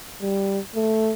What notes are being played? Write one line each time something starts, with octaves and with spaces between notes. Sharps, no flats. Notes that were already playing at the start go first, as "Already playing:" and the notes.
G3
A3